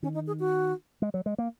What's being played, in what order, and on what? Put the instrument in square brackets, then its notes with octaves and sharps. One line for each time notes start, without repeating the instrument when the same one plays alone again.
[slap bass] D#3 [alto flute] C#4
[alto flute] D#4
G#4
F#4
[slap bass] G#3
F#3
G#3
A#3